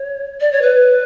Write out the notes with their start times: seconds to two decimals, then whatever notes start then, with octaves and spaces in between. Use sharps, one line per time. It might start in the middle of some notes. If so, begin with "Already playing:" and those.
Already playing: C#5
0.41 D5
0.52 C#5
0.62 B4